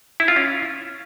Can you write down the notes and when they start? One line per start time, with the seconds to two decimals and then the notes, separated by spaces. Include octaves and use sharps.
0.20 E4
0.28 F4
0.36 C#4